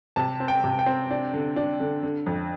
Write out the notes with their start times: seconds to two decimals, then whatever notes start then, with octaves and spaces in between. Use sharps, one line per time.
0.16 C3 A5
0.40 C4
0.48 G5
0.64 C3
0.79 G5
0.86 C4
1.10 D4
1.33 D3
1.56 D4
1.80 D3
2.03 D3
2.26 F2